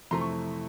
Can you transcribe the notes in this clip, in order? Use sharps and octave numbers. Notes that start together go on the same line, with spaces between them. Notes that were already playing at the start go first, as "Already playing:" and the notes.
F2 C3 E3 A3 A#5 C6
C#6